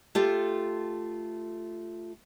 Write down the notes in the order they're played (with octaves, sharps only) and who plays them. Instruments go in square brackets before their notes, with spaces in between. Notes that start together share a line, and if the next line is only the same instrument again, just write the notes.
[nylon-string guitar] A3 F4 G4 A4